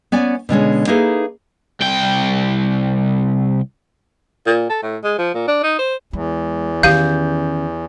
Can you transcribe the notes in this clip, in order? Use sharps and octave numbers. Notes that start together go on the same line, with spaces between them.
B3 C#4 D5 G#5
B2 D3 G#3 C#4
A#3 D#4 E4 G#4 A4 B4
C2 G5
A#2
A4
A2
G#3
F3
A#2
D4
D#4
C5
E2 G#3
D#3 C#4 G4 F5 G6